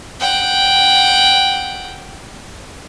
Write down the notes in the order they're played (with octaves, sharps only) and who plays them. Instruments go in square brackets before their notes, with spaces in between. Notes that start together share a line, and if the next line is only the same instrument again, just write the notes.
[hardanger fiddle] F#5 G5